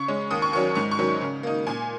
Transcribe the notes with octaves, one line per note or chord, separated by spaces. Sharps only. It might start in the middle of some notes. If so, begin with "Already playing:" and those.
Already playing: C#3 C#6
G#3 C#4
D#2 D#6
C#6
D#3 F#3 C#4 C#6
G#2 C#6
C#6
D#3 F#3 C#4
C#3
A#3 D#4
A#2 G#5